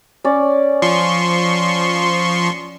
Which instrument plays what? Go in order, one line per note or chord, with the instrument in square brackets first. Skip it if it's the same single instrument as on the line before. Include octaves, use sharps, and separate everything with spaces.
[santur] C#4 D5
[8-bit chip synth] F3 C6 C#6